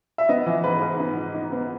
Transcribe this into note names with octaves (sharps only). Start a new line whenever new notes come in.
E5
B3 D#5
E3
G#2 B4
G#2
B3
D#4
D#4
B3